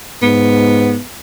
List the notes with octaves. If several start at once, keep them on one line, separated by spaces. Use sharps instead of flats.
G#2 B3